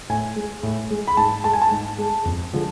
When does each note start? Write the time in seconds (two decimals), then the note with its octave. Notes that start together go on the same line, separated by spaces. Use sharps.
0.09 A2 G#5
0.36 G#3
0.63 A2
0.91 G#3
1.08 B5
1.17 G#2 A5
1.44 G#3 A5
1.53 G#5
1.62 A5
1.71 G#2
1.98 G#3
2.25 F2
2.53 D3 F3 G#3